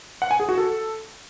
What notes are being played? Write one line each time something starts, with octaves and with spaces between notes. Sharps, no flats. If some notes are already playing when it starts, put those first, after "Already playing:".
F#5
G#5
G#4
F#4
A4